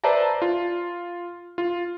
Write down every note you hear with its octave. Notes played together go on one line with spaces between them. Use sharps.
B4 C5 D5 E5 A5 A#5
F4
F4